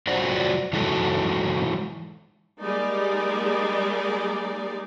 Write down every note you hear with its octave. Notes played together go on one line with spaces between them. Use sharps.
F#3 F4 F#4 C5 D5
E3 F#3 G#3 D#4 F#4 A4
G3 G#3 A#3 D#4 G#4 D5